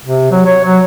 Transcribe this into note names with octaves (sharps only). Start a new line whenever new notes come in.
C3
F#3
C#5
F#3